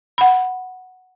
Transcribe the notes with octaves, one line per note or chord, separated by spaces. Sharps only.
F#5 B5